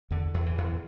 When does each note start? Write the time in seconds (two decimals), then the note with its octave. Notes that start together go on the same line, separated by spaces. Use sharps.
0.11 E2 D3
0.34 E2
0.46 E3
0.58 E2